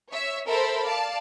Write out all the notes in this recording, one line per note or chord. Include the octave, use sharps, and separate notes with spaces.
C#5 E5
A4 A#4 C5 E5 A5 B5
D5 F5 A5